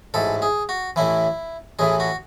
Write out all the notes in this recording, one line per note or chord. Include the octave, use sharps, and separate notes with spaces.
A1 G#2 E3 A4
G#4
F#4
A1 A2 E3 E4
A1 A2 E3 G#4
F#4